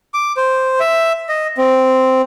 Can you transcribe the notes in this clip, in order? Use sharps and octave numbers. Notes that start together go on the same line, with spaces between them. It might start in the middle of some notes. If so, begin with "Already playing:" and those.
D6
C5
E5
D#5
C4